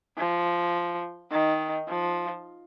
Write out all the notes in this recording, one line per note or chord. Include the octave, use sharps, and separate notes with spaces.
F3
D#3
F3